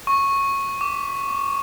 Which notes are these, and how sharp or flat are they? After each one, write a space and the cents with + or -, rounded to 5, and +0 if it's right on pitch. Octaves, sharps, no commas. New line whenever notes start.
C#6 -10
D6 -40